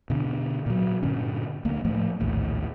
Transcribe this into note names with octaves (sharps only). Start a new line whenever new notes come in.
B2 D3
A#2 F#3
G2 A#2 D3 C#4
D2 A#3
A2 F3 A3
A#1 D#2 A2